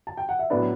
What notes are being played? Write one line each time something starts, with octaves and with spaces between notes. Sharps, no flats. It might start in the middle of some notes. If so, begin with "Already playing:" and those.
A5
G5
F#5
E5
A2 F#3 B3 D4 B4 D5